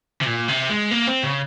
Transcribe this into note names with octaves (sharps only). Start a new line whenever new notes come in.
C3
A#2
C3
G#3
A#3
C4
C#3